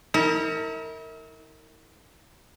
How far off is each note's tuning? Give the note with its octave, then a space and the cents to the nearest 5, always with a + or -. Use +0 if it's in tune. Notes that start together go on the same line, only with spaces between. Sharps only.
E4 -45 A#4 -25